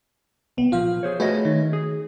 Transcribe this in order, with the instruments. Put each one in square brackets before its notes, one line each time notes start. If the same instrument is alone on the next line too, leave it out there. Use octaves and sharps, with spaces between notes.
[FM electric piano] C2 B3
[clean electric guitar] A#2 F3 [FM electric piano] F4 F5
[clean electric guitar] G#4 C5 C#5
[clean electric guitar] A3 C#5 D#5 [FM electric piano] F#4 G#4 B4
[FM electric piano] D#3
[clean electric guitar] G#4